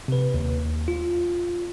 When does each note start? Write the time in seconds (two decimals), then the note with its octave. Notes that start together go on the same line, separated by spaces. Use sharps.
0.08 C3 B4
0.34 D#2
0.88 F4